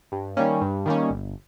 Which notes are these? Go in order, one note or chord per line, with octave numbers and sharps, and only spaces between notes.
G2
D#3 G3 A#3 C#4
G2
D#3 G3 A#3 C#4
G1